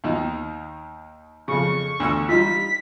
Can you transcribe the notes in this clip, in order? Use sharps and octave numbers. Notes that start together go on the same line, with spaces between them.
D#2 D#3 D#4
F2 C#3 C#6
D2 E6
G3 D#4 F4 B6